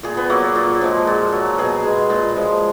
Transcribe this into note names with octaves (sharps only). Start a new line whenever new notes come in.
A#2 G#4
B3
F#3 A#3
A#2
F3 G#3
A#2
F#3
B2 G#4
G#3
A#2
F3 G#3